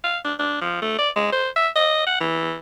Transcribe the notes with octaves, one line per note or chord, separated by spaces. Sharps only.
F5
D4
D4
F3
A3
D5
G#3
C5
E5
D#5
F#5
E3